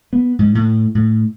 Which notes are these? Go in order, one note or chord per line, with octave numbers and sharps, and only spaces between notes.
B3
G#2
A2
A2